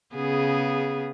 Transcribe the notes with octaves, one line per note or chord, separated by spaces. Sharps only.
C#3 B3 G#4